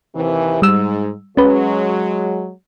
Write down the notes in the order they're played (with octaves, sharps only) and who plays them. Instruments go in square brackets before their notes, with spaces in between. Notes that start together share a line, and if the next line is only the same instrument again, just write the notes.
[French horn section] D#2 C3 E3
[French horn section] G#2 [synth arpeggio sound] G3 E6
[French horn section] F#3 G#3 [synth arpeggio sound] C#4 B4